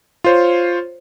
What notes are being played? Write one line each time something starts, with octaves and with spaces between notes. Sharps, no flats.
F4 C5 C#5